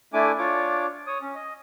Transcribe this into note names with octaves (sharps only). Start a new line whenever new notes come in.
A3 D4 E4 G#5 D6
D4 F4 C#5 D6
C#5 D#6
C#4
D#5